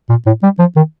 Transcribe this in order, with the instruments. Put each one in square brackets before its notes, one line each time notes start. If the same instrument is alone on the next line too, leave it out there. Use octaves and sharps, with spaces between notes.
[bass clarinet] A#2
A2
G3
F3
D#3